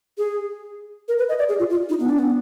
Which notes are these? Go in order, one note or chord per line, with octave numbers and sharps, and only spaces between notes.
G#4
A#4
B4
D#5
D5
G#4
F4
F4
D#4
B3
D4
B3